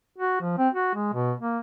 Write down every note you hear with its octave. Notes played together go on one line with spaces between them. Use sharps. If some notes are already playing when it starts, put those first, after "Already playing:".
F#4
F3
C4
F#4
G#3
B2
A#3